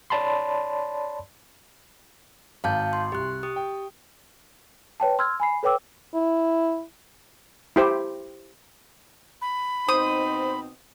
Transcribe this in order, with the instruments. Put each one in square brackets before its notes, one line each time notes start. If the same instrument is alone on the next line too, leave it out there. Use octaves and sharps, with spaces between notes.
[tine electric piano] C#5 D5 A5 B5 C6
[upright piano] G#1 [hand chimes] F5 A5 G6
[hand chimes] C6
[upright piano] C2 [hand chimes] G4 F#6
[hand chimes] G4 D#6
[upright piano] G5
[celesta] B4 C#5 G5 A5
C6 E6 F6 G#6
G#5 B5 C7
A4 B4 C#5 G5 D6 E6
[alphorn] E4
[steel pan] E4 G4 C5
[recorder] B5
[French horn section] B2 C4 D#4 [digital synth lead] C5 [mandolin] D#6